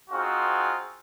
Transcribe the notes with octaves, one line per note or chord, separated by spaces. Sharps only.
C4 D#4 F4 F#4 G#4